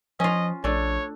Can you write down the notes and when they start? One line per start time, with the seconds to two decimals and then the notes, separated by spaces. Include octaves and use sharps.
0.20 F3 C#4 F4 D#5
0.64 A#1 A3 D4 C#5